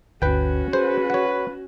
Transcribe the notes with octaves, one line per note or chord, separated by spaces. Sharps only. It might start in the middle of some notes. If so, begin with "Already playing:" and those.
G1 D2 C#4 F#4 B4 G5
G#4 B4 C5
C#5 F#5